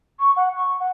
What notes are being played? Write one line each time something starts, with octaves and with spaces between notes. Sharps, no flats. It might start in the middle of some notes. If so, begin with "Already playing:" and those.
C#6
F#5
C#6
F#5